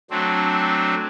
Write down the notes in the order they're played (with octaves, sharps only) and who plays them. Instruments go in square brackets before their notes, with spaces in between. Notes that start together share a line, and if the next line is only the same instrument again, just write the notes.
[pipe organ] F#3 A3 C4 D4